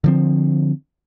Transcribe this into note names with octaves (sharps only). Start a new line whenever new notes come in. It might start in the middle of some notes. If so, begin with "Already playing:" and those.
D3 F3 C4